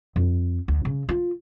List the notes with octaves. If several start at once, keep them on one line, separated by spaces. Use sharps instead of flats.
F2
D2
C#3
F4